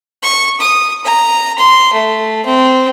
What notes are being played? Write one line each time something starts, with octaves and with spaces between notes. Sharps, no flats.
C#6
D#6
A#5
C6
A3
C4